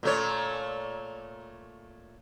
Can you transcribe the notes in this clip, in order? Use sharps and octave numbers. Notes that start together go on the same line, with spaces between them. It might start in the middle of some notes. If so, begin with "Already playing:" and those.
A#2 A3 C#5